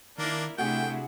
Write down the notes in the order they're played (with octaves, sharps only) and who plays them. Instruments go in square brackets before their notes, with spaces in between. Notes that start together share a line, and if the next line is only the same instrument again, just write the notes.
[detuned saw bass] D#3 [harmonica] A#3 D4 [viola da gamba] E4 A#4 D5
[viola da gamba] C3 D4 E4 [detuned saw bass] A3 [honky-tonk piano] F#4 G#4 [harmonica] G5